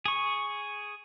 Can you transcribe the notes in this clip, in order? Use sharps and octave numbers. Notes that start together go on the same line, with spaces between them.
G#4 C#6